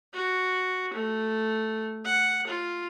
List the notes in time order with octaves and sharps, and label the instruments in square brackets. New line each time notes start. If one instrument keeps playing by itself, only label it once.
[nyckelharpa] F#4
A3
F#5
F4